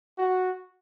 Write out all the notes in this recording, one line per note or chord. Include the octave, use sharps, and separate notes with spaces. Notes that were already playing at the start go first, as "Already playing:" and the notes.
F#4